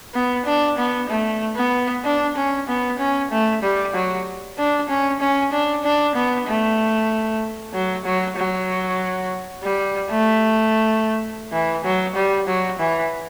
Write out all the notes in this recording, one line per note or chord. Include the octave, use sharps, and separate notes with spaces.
B3
D4
B3
A3
B3
D4
C#4
B3
C#4
A3
G3
F#3
D4
C#4
C#4
D4
D4
B3
A3
F#3
F#3
F#3
G3
A3
E3
F#3
G3
F#3
E3